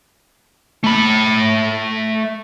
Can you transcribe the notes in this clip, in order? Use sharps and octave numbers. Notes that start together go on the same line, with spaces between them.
A3 B5